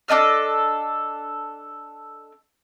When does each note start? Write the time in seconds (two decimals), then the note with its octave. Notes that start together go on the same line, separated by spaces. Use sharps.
0.08 D4 A4 D#5 F6